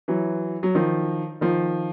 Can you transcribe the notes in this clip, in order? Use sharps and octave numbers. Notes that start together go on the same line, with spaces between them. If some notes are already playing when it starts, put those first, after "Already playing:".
E3 F#3
F#3
D#3 F3
D#3 F3